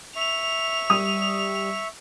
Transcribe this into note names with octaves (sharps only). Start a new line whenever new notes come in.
E5 C#6 F7
G3 D#6